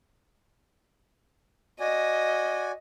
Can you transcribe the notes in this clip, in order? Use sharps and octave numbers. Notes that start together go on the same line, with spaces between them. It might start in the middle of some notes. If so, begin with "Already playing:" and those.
F#4 D5 D#5 G#5